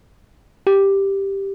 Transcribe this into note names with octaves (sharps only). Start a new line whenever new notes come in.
G4